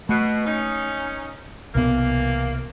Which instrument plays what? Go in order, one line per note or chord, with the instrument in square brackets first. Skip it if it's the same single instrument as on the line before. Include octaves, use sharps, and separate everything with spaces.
[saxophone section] B2 [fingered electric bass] A3
[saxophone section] C#4 D#4
[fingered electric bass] C2 B2 B3 [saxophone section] E3 A#3